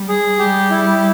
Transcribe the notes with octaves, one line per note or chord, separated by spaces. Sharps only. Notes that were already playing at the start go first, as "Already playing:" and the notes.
Already playing: G3
G#4
G3 G4
E4